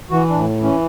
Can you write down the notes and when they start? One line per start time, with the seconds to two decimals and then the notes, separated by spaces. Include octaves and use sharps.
0.11 E3 F#4
0.28 D4
0.34 A2
0.58 E3
0.63 C#4